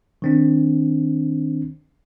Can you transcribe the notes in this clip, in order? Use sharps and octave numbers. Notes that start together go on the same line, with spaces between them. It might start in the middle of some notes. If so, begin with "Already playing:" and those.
D#3 C4 D4